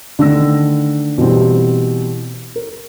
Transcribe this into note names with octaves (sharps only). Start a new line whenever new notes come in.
D3 D#3 A3 E6 A#6
B2 E3 G3 C4
A#4